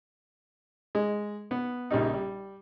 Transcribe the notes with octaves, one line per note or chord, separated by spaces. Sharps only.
G#3
B3
A#1 C#3 G3 D#4
G3